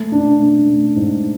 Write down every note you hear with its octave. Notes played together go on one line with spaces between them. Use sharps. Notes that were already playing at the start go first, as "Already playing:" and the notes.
Already playing: A3
D4
A3
A3
G#2